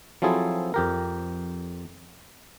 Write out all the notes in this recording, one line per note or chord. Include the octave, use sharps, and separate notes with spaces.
F3 F#3 C4 E4 G#4 A4
F2 G4 A#4